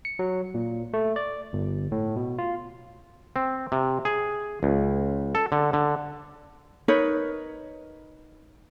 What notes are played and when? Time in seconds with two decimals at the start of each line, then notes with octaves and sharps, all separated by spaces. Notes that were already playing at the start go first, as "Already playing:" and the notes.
0.05 C#7
0.19 F#3
0.54 A#2
0.93 A3
1.16 D5
1.53 G1
1.92 A2
2.16 B2
2.38 F4
3.36 C4
3.72 C3
4.05 G#4
4.63 C#2
5.35 A4
5.52 D3
5.73 D3
6.88 D#4 A#4 B4 C#5